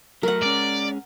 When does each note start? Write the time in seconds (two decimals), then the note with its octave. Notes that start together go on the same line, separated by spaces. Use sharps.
0.23 F#3 A3 A#4 F#5
0.43 G#3 C#4 D5